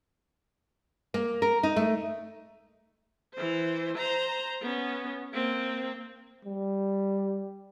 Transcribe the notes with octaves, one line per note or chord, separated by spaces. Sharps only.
A#3
A#4
D#4
A3
E3 C5
C5 A#5
B3 C#4
A#3 C4
G3